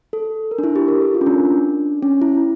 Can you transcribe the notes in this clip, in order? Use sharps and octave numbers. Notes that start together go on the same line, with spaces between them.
A4
A#4
D4
E4
G4
A#4
A4
F4
C#4
D4
C#4
E4